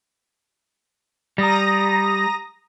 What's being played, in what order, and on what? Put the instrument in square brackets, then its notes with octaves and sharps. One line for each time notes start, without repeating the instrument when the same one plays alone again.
[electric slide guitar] G3 [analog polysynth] A#5 D#6 A#6